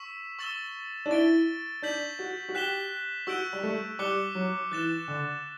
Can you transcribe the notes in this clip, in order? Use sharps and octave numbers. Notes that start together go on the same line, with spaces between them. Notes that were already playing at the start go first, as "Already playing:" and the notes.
Already playing: C#6 E6 B6 E7
C#6 E6 A6 E7 G7
D4
E4 A6 D7 G7
D4 G6 B6 F#7
F#4
F#4
G4 F#6 B6 E7 G7
F#4 C#6 E6 G6 D7 G7
G3
A3
G3 D6 F#6 C#7 G7
F#3
E3 F#6 A6 E7 G7
D3